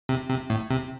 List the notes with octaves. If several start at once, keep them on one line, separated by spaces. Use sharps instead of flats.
C3
C3
A2
C3